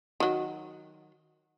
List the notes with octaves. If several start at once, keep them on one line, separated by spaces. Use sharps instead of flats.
D#3 F#3